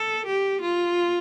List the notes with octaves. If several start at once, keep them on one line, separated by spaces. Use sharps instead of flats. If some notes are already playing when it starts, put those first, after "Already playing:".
Already playing: A4
G4
F4